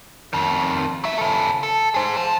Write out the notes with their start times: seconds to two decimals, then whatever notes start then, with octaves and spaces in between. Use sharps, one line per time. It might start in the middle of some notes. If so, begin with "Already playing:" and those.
0.33 F2 D#3
1.04 F#3 E5
1.18 C#3 A4
1.63 A4
1.94 G#4 C5
2.17 F3